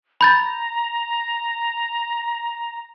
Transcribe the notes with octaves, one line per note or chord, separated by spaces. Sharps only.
A#5 B5 G6 A6